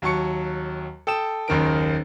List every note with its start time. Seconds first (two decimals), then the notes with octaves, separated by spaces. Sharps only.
0.02 D#2 F#3 A5 C#6 C#7
1.07 A4 G5 D#6 E7
1.48 F#1 D#2 D#3 A#4 D7